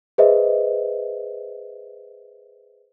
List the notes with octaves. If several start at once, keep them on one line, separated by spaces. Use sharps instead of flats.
G#4 B4 C5 D#5 E5